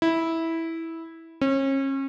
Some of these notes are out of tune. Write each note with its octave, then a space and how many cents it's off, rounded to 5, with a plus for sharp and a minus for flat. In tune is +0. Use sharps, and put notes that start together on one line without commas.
E4 -10
C#4 -35